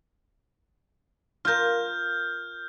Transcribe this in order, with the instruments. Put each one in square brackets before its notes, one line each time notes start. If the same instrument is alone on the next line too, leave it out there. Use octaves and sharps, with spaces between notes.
[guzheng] F4 A#4 [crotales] F6 G6